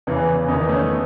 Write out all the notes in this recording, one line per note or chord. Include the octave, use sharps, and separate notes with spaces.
E2 C#3 E3 B3
E2 D#3 B3 D#4
A3 C#4
B3